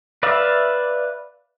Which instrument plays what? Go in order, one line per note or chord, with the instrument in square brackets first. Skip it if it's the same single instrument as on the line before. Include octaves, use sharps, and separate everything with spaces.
[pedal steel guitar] B4 D5 E5 F5